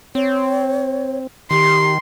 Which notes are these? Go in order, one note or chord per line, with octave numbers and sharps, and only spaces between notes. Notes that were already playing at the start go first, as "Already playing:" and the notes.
C4 C#5
D#3 G4 C6